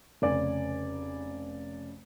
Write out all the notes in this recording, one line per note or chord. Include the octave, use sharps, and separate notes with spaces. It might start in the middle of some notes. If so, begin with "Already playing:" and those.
F1 C#3 D5 G#5